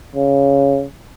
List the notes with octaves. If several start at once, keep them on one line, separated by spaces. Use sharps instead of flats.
C#3